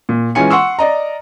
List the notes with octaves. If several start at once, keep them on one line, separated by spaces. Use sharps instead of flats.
A#2
E3 G#3 C#4 F4 G#5 C#7
F#5 C6 C#6 E6
D5 D#5 A#5